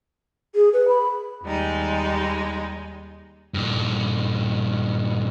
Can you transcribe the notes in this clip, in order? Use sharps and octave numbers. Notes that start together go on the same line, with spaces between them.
G#4
B4
B5
D#2 G3 G#3 D#4
G2 A#2